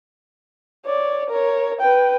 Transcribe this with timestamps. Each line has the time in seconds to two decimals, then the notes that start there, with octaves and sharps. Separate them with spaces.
0.85 C#5 D5
1.29 A#4 C#5
1.81 B4 G5